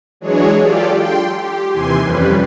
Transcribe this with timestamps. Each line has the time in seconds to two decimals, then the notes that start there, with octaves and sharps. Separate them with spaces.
0.21 E3 F#3 G#3 D4 G#4 C#5
0.61 F4 G4 A4 D5
0.93 G5 C6
1.36 G4
1.71 D#2 C3 E3 G#5 C6
2.02 F2 G3 C#4 B4